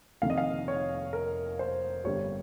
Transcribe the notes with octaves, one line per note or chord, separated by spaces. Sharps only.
F1 F2 D#3 F5
D#5
F5
C#5
A#4
C5
G1 G2 G3 C#5